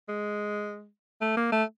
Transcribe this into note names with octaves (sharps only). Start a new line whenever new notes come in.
G#3
A3
A#3
A3